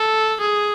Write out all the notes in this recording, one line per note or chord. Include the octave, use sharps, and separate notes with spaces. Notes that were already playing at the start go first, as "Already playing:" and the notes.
Already playing: A4
G#4